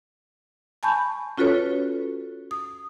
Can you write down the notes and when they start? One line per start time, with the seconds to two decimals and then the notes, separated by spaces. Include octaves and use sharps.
0.83 G#5 A5 B5 C#6 G6
1.38 C#4 F4 F#4 A4 B4 C#5
2.51 D#6